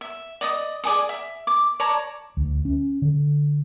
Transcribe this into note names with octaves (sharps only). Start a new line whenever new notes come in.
E5
D5 D#5 D#6
G#4 D5 G#5 D#6
E5
D6
C#5 D5 A5 A#5
D2
C#4
D3